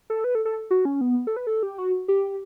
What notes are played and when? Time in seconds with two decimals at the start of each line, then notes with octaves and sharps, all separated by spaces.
0.10 A4
0.24 B4
0.35 A4
0.45 A4
0.71 F#4
0.85 C#4
1.01 B3
1.27 A4
1.36 B4
1.47 A4
1.63 G4
1.78 F#4
2.08 G4